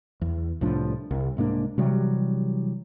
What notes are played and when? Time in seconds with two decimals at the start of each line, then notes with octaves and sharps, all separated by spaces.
0.21 E2
0.61 C2 A2 F3 D4
1.11 C2
1.37 C2 G#2 A#3 D4
1.78 C3 E3 F#3 G3